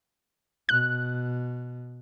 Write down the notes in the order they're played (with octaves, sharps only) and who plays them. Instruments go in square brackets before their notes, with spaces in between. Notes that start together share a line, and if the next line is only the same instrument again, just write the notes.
[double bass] B2 [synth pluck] F#6